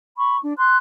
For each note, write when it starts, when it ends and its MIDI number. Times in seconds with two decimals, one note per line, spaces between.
0.17 0.38 83
0.17 0.38 85
0.43 0.53 62
0.57 0.76 84
0.57 0.76 90